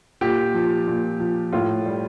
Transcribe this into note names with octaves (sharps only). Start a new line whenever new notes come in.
A#2 G4
F3
A#2
F3
A2 F4
G3